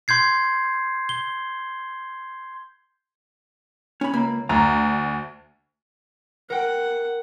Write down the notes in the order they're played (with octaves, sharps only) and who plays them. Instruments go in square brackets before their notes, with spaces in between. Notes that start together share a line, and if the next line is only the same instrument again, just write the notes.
[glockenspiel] C6 G6 G#6 C7
G7
[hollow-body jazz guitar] C#4 B5
C#2 A#3 B5
[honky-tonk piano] D2 [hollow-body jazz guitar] A#5
[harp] A#4 G5 [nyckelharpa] F#5